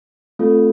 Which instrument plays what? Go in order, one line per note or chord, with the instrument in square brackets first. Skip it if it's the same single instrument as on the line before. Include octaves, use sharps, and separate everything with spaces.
[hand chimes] A3 C4 F4 A4